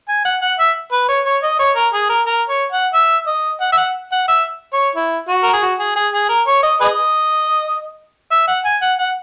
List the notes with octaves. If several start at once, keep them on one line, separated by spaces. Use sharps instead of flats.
G#5
F#5
F#5
E5
B4
C#5
C#5
D#5
C#5
A#4
G#4
A#4
A#4
C#5
F#5
E5
D#5
F#5
E5
F#5
F#5
E5
C#5
E4
F#4
A#4
G#4
F#4
G#4
G#4
G#4
A#4
C#5
D#5
G#4 B4 D#5
E5
F#5
G#5
F#5
F#5